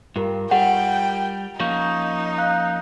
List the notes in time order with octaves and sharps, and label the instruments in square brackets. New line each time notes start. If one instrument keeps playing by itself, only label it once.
[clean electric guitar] G2 [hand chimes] F4 G4 A#4
[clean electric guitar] G3 [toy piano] F#5 [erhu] G5
[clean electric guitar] F3 A#3 C#4 [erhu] D#4 [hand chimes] F5 C#6 G6
[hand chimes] F5 F#6 G6